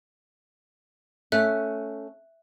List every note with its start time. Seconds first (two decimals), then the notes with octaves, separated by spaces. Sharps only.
1.32 A3 C#4 E5 F#6